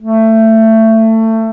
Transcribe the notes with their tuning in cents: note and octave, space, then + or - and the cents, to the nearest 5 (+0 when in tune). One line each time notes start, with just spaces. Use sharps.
A3 +20